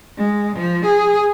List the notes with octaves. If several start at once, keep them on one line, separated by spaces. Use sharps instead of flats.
G#3
F3
G#4